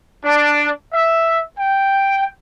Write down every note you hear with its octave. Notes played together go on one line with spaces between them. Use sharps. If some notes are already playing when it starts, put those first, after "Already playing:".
D4
E5
G5